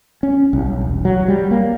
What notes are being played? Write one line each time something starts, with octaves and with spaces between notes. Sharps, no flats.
C#4
C2
B1
E1
F#3
G3
A#3